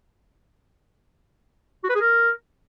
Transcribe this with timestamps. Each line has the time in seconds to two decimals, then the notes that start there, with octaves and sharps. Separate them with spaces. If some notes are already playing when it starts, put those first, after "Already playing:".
1.84 F#4
1.90 B4
1.95 G#4
2.01 A#4